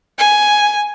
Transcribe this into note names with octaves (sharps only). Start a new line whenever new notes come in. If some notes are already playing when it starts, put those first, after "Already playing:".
G#5